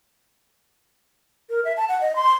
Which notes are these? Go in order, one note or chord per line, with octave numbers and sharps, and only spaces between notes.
A#4
E5
A5
F#5
D#5
C6